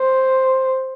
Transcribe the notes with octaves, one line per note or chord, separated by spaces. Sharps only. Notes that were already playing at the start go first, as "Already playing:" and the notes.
Already playing: C5